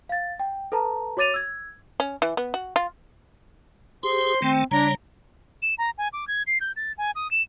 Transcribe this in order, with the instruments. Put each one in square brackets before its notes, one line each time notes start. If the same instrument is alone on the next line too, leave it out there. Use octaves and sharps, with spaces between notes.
[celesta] F5 A6
G5
A4 B4 A5 A#5
F#4 C#5 D6 A6 D#7 F7
E6 G#6
[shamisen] C#4
E3
B3
F#4
F4
[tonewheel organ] G4 G#4 [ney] C5 [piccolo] C6
[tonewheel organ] D#3 A3 [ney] C4
[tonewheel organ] C#3 G3 C#5 [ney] D4 [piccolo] A#5
[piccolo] E7
A#5
G#5
D6
G#6
C7
G6
A6
G#5
D#6
E7